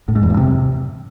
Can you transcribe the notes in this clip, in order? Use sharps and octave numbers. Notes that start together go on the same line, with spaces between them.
A2
G#2
E2
G2
C3